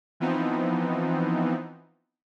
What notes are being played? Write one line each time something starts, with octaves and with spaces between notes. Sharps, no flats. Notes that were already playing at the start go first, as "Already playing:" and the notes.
E3 F3 B3 C4 D#4